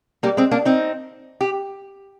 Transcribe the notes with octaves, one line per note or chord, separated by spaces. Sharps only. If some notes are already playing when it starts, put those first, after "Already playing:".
G3 A#3
G#3 C4
A#3 D4
C4 D#4
G4